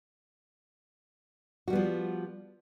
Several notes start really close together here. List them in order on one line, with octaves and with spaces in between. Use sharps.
F#4 G3 B3 F3